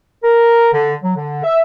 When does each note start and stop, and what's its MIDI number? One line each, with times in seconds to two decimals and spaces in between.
0.23 0.67 70
0.73 0.94 50
1.03 1.13 54
1.16 1.39 50
1.44 1.61 76